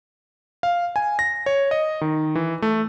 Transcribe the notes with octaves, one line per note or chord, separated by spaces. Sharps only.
F5
G#5
A#6
C#5
D#5
D#3
E3
A3